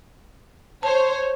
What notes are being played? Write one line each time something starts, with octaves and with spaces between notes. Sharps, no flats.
C5 C#5 A5